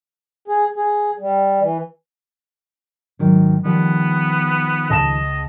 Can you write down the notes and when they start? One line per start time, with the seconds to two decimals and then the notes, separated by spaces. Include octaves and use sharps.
0.48 G#4
0.76 G#4
1.20 G3
1.61 E3
3.19 G#2 D#3 F#3
3.65 D#3 F3 G3 B3
4.90 C#2 D#5 A5 E7